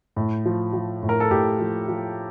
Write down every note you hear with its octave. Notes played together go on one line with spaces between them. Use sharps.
A2
F3
F3
A2
A#4
A4
A2 G4
F3
F3